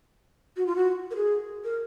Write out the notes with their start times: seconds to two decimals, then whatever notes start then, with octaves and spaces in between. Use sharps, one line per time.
0.57 F#4
0.66 F4
0.76 F#4
1.11 A#4
1.16 G#4
1.64 A#4